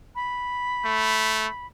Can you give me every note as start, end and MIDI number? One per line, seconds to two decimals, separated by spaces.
0.15 1.66 83
0.85 1.47 57